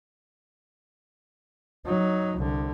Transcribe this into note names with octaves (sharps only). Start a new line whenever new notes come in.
F#3 D#4
C2 D3